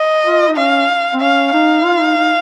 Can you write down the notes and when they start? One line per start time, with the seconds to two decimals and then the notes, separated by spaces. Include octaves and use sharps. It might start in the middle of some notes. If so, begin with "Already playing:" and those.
Already playing: D#5
0.24 F4
0.49 D#4
0.56 C#4 F5
1.14 C4
1.20 C#4 F5
1.53 D#4 F5
1.85 F4
2.01 D#4
2.17 D#4